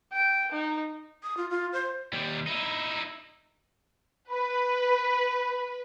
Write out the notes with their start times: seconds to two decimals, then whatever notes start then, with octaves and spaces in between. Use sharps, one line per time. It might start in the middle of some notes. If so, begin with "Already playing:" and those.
0.13 G5
0.52 D#4
1.23 D#6
1.37 F4
1.50 F4
1.73 C5
2.13 D#2 G3
2.47 D#4 E4
4.32 B4 B5